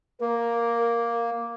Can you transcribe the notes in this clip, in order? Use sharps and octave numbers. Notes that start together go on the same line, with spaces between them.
A#3 A#4